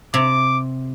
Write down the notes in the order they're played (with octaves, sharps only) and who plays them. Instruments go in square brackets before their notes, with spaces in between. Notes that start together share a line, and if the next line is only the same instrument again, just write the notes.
[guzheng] C3 [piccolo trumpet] D6